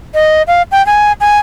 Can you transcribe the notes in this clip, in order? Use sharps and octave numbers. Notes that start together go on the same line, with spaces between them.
D#5
F5
G5
G#5
G#5